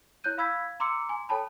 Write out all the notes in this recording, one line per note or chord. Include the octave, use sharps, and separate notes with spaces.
E4 C#5 F#6 G6 D#7
F5 B5 E6 G#6 B6
A#5 C6 D6 E6 C#7
G#5
A4 C#5 G5 A5 B5